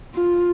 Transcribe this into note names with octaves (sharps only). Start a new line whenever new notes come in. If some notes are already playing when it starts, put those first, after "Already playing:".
F4